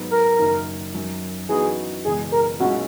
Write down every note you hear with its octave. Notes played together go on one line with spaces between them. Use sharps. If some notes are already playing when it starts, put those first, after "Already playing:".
Already playing: G#2 F#3 B3
A#4
F#1 F#2 D#3 A#3
F#2 D#3 F#3
F#2 E3 B3 D#4 F#4 G#4
F#1 E2 B2 G#3 G#4
A#4
B1 A#2 G#3 C#4 E4 F#4